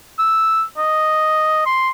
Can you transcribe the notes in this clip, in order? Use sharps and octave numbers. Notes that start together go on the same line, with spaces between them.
E6
D#5
C6